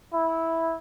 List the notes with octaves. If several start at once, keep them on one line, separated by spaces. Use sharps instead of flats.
E4